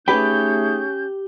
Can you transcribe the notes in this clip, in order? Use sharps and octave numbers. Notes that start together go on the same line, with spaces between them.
A3 C#4 D#4 G4 G#4 B4 G5 G6